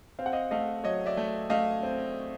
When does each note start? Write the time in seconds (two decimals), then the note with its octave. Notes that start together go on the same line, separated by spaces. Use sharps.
0.19 C4 F5
0.26 F#5
0.32 D#5 F5
0.51 A3 D#5 F5
0.84 F#3 C#5 D#5
1.06 D5 E5
1.17 A3
1.50 A3 D#5 F5
1.83 C4